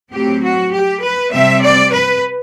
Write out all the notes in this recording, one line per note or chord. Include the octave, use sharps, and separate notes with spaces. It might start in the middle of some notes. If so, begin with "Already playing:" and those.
A2 F#3 C4 G4
F#4
G4
B4
C3 G3 C4 E5
D5
B4